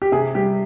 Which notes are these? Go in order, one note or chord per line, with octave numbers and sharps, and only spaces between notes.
G4
C3 G#4
G3 G4